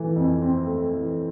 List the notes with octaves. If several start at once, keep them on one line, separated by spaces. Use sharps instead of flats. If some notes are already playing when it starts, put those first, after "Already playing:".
Already playing: E3 A3
F2
C4
A3
E3